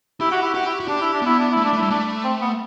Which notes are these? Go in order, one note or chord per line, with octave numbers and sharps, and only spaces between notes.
E4 G4
F#4
E4
F#4 G4
E4
F#4
D4 G4
E4
D4
B3 E4
D4
A3 E4
D4
A3
E4
G3
A3 D4
C4
B3